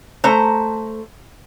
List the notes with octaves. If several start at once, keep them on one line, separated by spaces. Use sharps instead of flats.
A3 C5 A#5